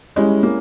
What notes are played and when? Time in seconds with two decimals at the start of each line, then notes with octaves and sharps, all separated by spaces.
0.16 G3 G#3 C#4 E4
0.43 A#3